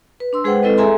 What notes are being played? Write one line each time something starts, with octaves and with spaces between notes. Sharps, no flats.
B4
D4 C6 E6
G#3 G#4 B4 C5 F#5 G5
G#3 C4 E4 A4 B4 D#5
G#4 A4 E5 G#5 A#5 C6